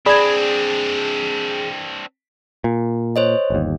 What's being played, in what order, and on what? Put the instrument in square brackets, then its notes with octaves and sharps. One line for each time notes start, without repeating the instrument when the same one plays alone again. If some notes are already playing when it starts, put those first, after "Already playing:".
[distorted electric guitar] C4 D4 [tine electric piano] G#4 [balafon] D5 [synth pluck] B5 G#6
[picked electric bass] A#2
[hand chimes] C5 C#5 D#5
[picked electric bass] G1 D#2